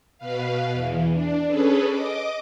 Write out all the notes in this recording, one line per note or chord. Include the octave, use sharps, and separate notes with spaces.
B2 B4 F5
E2 E3
D4
C#4 G#4 A4 B4
D#5 D6